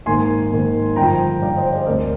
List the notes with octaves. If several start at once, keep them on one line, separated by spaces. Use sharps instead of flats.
G#2 D#3 A#3 G#5 C6
G#2 D#3 A#3
G2 D3 F3 G5 A#5
G2 D3 F3 D5 F5
C5 D#5
G#4 C5
D2 D3 G#3 C4 A#4 D5